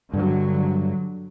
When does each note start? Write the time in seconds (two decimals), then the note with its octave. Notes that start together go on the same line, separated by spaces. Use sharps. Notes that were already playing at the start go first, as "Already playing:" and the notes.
0.14 G2 D3 F#3